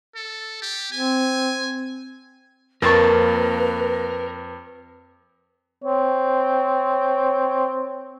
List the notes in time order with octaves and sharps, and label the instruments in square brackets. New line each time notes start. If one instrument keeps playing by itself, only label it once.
[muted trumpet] A4
G4
[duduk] C4 [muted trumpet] G#5
[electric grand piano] F2 [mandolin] A#3 A5 C#6 [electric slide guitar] A#4 [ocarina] B4
[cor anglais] C4 [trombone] C#5